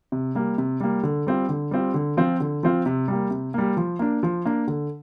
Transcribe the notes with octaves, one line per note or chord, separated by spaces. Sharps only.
C3
G3 A#3
C3
G3 A#3
D3
G3 C4 F4
D3
G3 C4 F4
D3
F3 C4 F4
D3
F3 C4 F4
C3
G3 A#3
C3
G3 A#3
F3
A#3 D4
F3
A#3 D4
D3